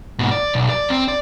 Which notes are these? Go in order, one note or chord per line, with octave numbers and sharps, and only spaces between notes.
G#2 B2
D5
B1
D5
C4
D5